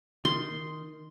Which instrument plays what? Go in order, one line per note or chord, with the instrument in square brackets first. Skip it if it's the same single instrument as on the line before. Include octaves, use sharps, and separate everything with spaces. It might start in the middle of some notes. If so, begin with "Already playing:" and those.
[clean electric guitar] D#3 [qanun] C6